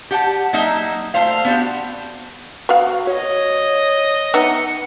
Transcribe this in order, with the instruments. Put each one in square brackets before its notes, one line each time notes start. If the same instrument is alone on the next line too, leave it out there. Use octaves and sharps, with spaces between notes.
[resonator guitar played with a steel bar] G4 F#5 A5
F#3 A#3 D#4 E5
A3 F4 C5 F5
B3 D4 F#4 G4
[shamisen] B3 F5 [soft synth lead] F#4
[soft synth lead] C#5 [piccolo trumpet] D#5
[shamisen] B3 D#4 E5 [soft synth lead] C#7